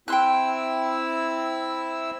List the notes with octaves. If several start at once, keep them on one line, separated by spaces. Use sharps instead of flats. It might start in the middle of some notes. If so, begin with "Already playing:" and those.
C4 E4 G5 C6 E6 F#6